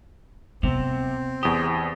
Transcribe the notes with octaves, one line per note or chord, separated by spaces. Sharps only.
C3 B3 C4
E2 G4 D#6